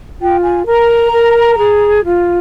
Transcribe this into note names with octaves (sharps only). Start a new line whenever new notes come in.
F4 G5
G#5
A#4 A#5
A#4
G#4
F4